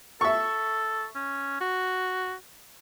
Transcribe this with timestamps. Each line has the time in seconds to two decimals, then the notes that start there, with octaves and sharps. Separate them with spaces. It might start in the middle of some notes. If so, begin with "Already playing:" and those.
0.21 A4 E5 C#6
1.15 C#4
1.61 F#4